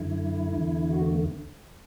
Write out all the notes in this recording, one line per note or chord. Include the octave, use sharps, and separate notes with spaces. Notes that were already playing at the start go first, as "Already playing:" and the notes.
Already playing: F#2 D3 E4
E2 D3
F#4
A3